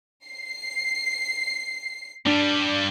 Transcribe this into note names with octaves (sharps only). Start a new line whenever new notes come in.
C7
G2 G3 D4